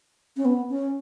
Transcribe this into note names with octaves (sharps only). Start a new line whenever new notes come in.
C#4
B3
C#4